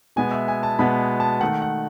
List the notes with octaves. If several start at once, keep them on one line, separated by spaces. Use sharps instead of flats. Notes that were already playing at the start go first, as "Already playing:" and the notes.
B2 G#3 B3 G#5
E5
G#5
A5
B2 G#3 B3 B5
A5
D#3 A3 F#5
F#5